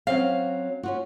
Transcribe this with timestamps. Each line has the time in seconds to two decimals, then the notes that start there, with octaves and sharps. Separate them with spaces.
0.07 F#3 C4 C#4 F5
0.83 C#4 F4 F#4